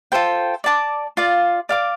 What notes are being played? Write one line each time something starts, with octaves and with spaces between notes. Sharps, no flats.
F4 A4 C5 G5
D5 A5 D6
F4 D5 F5
D5 F5 D6